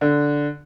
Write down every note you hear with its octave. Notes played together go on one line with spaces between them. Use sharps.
D3